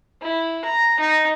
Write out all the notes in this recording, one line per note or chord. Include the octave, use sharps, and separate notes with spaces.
E4
A#5
D#4